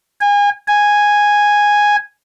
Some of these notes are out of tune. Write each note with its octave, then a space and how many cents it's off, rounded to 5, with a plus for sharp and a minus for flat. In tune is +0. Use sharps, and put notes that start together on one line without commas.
G#5 -30
G#5 -5